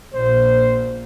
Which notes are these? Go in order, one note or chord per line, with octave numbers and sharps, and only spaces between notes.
A#1 A#2 C5